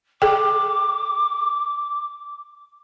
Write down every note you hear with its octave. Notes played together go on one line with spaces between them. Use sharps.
G#4 A4 G5 D6